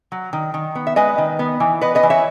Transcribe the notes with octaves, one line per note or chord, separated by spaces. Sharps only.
F#3
D#3
D#3
B3
E5
G#3 B4 D#5
D#3
B3
E3
B3 B4 D#5
B4 D#5
E3
C#5 E5